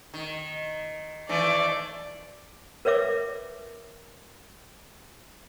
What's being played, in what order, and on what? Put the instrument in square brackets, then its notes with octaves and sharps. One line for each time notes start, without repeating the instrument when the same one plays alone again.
[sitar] D#3
[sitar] D#3 E3 A3 [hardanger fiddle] D5
[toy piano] A#4 B4 C#5 E5 D6